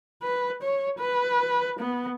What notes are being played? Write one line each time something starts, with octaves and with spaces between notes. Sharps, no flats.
B4
C#5
B4
B3